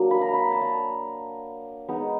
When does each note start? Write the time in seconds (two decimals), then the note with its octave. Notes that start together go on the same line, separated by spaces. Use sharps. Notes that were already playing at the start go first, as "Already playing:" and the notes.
Already playing: F#3 A#3 D4
0.11 B5
0.21 A#5
0.34 B5
0.51 A5
0.62 A#5
1.89 G#3 B3 D#4